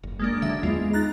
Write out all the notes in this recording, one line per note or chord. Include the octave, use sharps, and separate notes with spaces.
F#1
G#3 A#3 D4
D3 F#3 D4 E5
E2 G#3 A3 B3 F4
D#4 A#5 F#6 A6